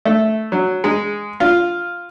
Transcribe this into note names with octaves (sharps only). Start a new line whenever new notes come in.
A3
F#3
G#3
F4